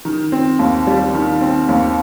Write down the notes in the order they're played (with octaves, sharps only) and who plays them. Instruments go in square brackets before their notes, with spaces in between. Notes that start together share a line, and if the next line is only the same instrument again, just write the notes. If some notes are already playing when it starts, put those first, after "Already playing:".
[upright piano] D#3
C4
D#2
G3
D#3
C4
D#2